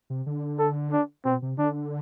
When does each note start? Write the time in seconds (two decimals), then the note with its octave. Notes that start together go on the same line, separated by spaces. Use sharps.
0.10 C3
0.26 D3
0.59 A4
0.92 D4
1.25 B2 C4
1.42 C3
1.58 D3 D4